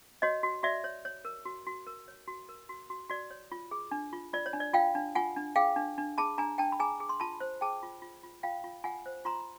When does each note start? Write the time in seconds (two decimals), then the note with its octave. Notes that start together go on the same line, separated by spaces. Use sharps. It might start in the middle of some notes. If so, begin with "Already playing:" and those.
0.22 F#4 C#5 D#5
0.43 F#4
0.63 F#4 D5 E5
0.84 C#5
1.05 C#5
1.25 A#4
1.45 F#4
1.67 F#4
1.87 A#4
2.08 C#5
2.28 F#4
2.49 A#4
2.69 F#4
2.90 F#4
3.09 F#4 D5
3.31 C#5
3.52 F4
3.71 G#4
3.91 D4
4.13 F4
4.33 F4 D5
4.46 C#5
4.53 D4
4.60 D5
4.74 F4 F5 G5
4.95 D4
5.15 F4 F#5 G#5
5.36 D4
5.56 G#4 F5 G5
5.76 D4
5.98 D4
6.18 G#4 A5 B5
6.38 D4 G#5 A#5
6.58 D4 G5 A5
6.72 B5
6.79 G#4 G#5 A#5
7.00 G#4
7.09 C6
7.20 F4 A5 B5
7.40 C5
7.61 G#4 G5 A5
7.83 F4
8.02 F4
8.23 F4
8.43 F4 F5 G5
8.64 F4
8.84 F4 F#5 G#5
9.06 C5
9.25 F4 A#5 C6